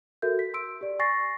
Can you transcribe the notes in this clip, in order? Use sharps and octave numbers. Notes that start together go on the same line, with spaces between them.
F#4 A4 A#4 E5 G6
B6
C6 E6 D7
G4 D5
G#5 C#6 A6 A#6 C7